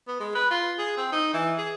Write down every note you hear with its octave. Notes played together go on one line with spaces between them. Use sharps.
B3
G#3
B4
F4
G#4
C4
D#4
E3
G#4